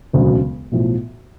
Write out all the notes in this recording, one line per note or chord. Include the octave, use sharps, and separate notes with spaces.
E1 D2 C#3 F#3
B1 A2 F3